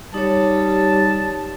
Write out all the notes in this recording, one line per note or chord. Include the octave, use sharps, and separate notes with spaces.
G3 D#4 C#5 A5